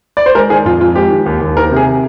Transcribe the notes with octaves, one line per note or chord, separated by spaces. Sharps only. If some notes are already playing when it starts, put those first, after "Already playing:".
D5
C5
G#3 A#4
D#3 G#4
F2 F4
F2 F4
G#3 G4
D#3
D#2
D#2
D#3 A#4
C3
G#4